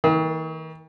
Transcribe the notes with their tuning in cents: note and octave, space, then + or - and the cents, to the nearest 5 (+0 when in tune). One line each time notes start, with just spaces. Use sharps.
D#3 +45 A#3 -25 D#6 +45